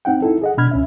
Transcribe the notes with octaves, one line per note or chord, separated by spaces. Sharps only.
C4 D#4 F#5 G5
D#4 E4 A4
G#4 D#5 F#5
B2 D4 B5 F6 G#6
C#2 C#4 E5